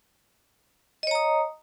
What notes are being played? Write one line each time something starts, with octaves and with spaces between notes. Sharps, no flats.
C#5 D#5 A#5 D#6